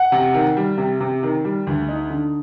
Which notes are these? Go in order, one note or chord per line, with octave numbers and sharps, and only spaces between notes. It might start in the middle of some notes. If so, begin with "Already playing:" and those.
Already playing: F#5
C3
D#3
G3
C3
C3
D#3
G3
D2
D#4
D3